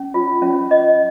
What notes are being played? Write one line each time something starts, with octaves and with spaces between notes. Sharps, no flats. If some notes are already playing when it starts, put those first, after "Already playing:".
Already playing: C#4
F4
C#4
D#5